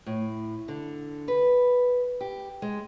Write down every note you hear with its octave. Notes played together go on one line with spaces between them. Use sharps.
A2
D3
B4
G4
G#3